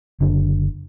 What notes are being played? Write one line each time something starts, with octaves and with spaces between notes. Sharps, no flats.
F#1 D3